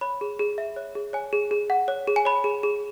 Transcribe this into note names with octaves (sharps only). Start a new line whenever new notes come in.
C#5 B5
G#4
G#4
E5
C#5
G#4
C#5 G#5
G#4
G#4
F#5
C#5
G#4
G#5
C#5 B5
G#4
G#4